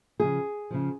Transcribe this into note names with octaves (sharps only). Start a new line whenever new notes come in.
C#3 F3 G#4
C#3 F3